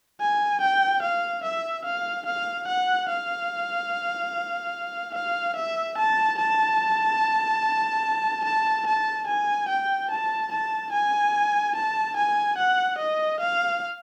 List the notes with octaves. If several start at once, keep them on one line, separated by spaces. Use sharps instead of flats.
G#5
G5
F5
E5
F5
F5
F#5
F5
F5
E5
A5
A5
A5
A5
G#5
G5
A5
A5
G#5
A5
G#5
F#5
D#5
F5